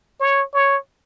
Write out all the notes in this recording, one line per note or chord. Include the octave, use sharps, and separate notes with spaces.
C#5
C#5